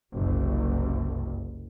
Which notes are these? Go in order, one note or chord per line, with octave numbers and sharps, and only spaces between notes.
F#1 C2